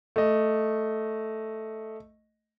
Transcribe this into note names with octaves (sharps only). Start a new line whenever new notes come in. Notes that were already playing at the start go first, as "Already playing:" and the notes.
A3 D#5